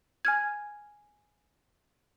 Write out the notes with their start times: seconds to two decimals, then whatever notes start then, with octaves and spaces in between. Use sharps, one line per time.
0.25 G#5 F6 G#6